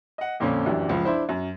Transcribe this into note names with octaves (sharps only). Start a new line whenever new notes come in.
D#5 F#5
F2 A#2 D3 F3 C#4 D4
D1 F#2 E3 D4 G4
C#2 F3
D4 E4 C5
F#2